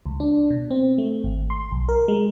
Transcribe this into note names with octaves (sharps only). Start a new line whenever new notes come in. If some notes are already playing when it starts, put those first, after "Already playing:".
C#2
D4
B2
C4
A3
G#1
C6
B1
A#4
G#3